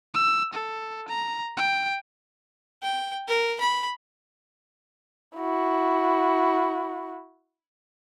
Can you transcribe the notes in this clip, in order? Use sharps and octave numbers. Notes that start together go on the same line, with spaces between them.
E6
A4
A#5
G5
G5
A#4
B5
E4 F#4